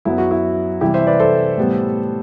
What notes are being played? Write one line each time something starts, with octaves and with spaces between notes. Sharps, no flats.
F#2 F#3 B3 E4
F#4
E4
C3 E3 G3 E4 G4
C5 E5
B4 D5
A4 C5
A2 G3 B3